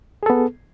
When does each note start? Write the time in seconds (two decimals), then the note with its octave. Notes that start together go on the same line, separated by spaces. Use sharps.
0.23 G#4
0.26 A4
0.30 B3